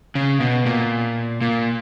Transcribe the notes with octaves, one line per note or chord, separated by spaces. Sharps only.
C#3
B2
A#2
A#2